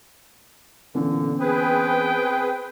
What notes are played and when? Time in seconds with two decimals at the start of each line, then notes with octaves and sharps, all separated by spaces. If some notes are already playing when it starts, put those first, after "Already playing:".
0.94 A#2 D3 E3 B3 C#4
1.40 C4 G#4 B4 G5